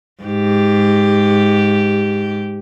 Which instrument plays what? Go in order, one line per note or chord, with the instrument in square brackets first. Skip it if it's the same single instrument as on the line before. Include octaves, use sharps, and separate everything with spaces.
[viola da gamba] G#2 G4